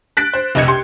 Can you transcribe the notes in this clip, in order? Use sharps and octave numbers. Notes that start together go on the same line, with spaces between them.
F#6 A6 B6 D7
C5
F1 C2 D#5 G#6 C#7
G4 C6